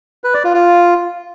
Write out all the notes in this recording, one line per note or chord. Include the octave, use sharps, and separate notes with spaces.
B4
D5
F4
F4